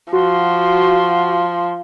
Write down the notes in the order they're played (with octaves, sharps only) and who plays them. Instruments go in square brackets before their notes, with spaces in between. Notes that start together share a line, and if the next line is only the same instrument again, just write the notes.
[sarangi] F3 [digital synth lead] F#4 [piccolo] C6